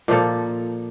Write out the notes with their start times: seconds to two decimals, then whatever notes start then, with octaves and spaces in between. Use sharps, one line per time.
0.08 A#2 F3 A#3 A4